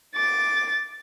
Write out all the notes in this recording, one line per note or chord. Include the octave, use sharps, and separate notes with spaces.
D6 A6